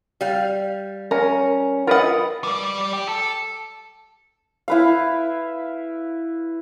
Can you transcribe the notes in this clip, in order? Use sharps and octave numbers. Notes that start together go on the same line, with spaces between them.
G3 F5
C#4 A#4
F4 A#4 B4 D#5 F#5
G3 D5
G4
A4
E4 B4 F5